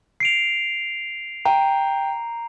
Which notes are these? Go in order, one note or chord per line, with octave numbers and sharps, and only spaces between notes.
C7 D7 F7
G5 A#5